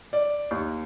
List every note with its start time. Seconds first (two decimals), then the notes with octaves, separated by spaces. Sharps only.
0.13 D5
0.51 D#2